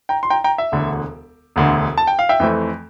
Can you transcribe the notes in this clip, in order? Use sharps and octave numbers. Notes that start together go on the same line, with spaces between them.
G5 A#5
C6
G5 A#5
G5 A#5
E5
E1 D2 D3
E1 D2 D3
A5
G5
F5
E5 G5
F2 E3 A3 C4